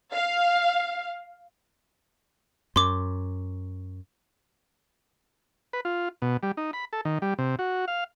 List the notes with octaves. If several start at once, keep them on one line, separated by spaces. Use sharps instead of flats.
F5
F#2 C6 D6
B4
F4
B2
G3
D#4
B5
A4
D#3
G3
C3
F#4
F5